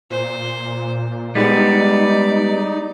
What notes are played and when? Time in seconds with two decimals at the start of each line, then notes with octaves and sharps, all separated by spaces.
0.10 A#2 C5
1.35 G3 G#3 B3 D#4 D5